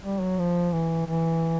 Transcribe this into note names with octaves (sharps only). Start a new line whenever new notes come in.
G3
F#3
F3
E3
E3